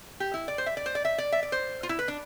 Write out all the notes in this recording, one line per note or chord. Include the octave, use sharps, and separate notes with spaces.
G4
E4
D5
C5
E5
D5
C5
D5
E5
D5
E5
D5
C5
F4
E4
B4
D4